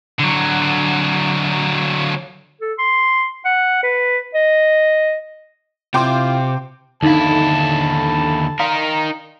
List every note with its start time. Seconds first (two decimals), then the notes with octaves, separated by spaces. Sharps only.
0.19 D3 F#3
2.61 A4
2.79 C6
3.45 F#5
3.83 B4
4.35 D#5
5.94 C3 E4 F4 G5 C6 D6
7.03 D#2 D3 D#4 E4 F5 A5
8.59 D#4 A#4 D5 F5 A#5 C6